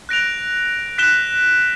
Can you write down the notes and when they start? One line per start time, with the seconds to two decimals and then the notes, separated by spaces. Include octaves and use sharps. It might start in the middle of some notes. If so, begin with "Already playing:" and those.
0.09 F#6 A#6 D7 F7
0.98 F#6 B6 E7 G7